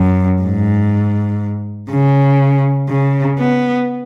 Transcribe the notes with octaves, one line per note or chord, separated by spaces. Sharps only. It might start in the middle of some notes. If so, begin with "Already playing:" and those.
Already playing: F#2
G#2
C#3
C#3
B3